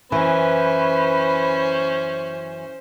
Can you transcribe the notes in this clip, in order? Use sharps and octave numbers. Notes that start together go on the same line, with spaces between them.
F#2 E3 C#4 B4 C5